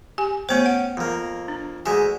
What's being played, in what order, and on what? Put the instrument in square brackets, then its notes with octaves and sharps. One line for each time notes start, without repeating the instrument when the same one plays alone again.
[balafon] G4 G#5
[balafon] A3 B3 C5 [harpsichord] C#4 G5
[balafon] F#5
[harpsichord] F2 A#3
[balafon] D4
[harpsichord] D2 G#3 E5 [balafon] G#5